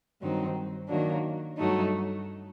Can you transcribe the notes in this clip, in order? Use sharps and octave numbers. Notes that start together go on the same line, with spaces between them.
G2 D#3 F#3 C4 D#4
D#3 F#3 A#3 D4
G2 F#3 A3 D#4